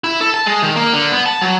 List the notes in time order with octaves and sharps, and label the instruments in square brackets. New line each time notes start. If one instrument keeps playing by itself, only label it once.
[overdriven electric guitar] E4
A4
A5
G#3
D#3
A#3
D3
B3
A5
F#3